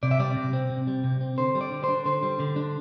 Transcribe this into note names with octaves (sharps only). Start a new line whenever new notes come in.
C3 D5
E5
G3 D5
C3
C4
C3
G3
C3
C4
D3 C5
G3
D5
D3
D4 C5
D3 C5
G3
D3
D4